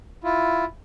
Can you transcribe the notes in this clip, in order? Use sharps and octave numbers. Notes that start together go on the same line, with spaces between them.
E4 F4